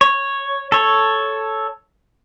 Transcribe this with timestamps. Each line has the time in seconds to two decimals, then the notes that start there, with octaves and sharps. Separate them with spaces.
0.01 C#5
0.72 A4 C#5